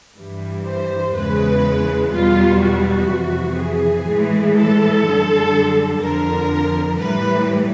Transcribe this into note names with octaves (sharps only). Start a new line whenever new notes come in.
G2 E3 G3
C5
E2 C#3 E3 G#3 B4
E2 B2 G3 F4
F#4
F2 C3 E3
G#4
A2 E3 G#3
A4
F#2 D3 G3
F2 D3 F3 A#4
A2 E3 G3 B4